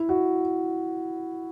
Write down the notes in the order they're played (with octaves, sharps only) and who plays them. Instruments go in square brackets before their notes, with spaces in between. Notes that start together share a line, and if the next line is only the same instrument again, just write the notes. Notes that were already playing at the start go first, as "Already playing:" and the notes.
Already playing: [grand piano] E4
F#4